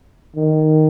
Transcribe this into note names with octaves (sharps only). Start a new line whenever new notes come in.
D#3